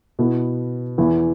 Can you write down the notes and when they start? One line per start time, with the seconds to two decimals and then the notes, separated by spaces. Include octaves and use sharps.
0.19 B2 B3 E4
0.98 E2 E3 B3 E4